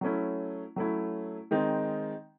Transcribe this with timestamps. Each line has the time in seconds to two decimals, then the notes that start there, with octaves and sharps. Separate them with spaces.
0.01 F#3 A3 C#4 E4
0.76 F#3 A3 C#4 E4
1.51 D#3 G#3 C4 D#4